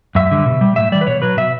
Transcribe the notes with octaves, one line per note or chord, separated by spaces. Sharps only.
F#2 E5
D3 G3
B2
G3
A2 E5
E3 G3 D5
B4
B2 C#5
F#3 B4
B2 E5